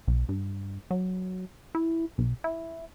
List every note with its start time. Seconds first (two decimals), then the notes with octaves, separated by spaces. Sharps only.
0.08 B1
0.29 G2
0.91 F#3
1.75 E4
2.18 B1
2.44 E4